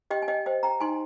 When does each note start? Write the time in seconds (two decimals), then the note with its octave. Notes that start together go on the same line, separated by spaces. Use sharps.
0.11 G4 D#5 G5
0.22 G#5
0.28 D#5 G5
0.46 C5 D#5 G5
0.63 G5 A#5
0.80 D#4 G#5 C6